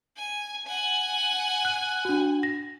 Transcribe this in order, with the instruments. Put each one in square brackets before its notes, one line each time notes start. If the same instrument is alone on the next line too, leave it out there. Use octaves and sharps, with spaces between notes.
[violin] G#5
F#5 G#5
[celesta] F#6
D4 F#4
A#6